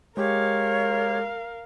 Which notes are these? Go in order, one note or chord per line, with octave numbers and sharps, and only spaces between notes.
G#3 G4 A#4 C#5 F5